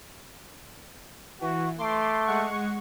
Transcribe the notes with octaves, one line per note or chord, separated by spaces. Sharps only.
E3 F#4
A3 C6 D6
G#3 F#5 C#6